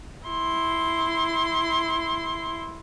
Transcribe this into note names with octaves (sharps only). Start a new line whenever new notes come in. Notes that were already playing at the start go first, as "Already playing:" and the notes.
E4 C6